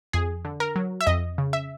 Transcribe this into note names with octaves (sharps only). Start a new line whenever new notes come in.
F2 G#4
D3
A#4
F#3
E5
F2 D#5
C#3
E5